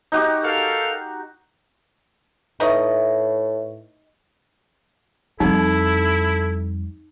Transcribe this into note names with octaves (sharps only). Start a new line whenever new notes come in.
D#4 F#4 G4
A4 A#4 F5
A2 D#4 B4 D#5 E5 C#6
F2 G3 D#4 E4 A4